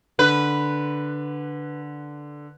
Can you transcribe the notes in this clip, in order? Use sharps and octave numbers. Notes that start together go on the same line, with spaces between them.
D3 B4